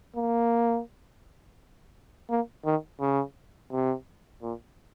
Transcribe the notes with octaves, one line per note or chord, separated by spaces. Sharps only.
A#3
A#3
D#3
C#3
C3
A#2